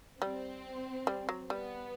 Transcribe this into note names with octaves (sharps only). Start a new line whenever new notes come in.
G3 C4
G3
F#3
G3 B3